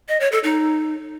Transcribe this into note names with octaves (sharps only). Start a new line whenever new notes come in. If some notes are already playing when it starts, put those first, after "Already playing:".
D#5
C#5
A4
D#4